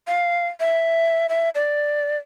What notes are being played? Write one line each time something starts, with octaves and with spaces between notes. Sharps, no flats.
F5
E5
E5
D5